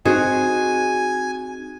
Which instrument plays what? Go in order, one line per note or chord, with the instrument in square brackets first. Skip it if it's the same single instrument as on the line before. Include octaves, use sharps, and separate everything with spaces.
[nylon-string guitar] C4 D#4 [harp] F#4 G#4 [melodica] G#5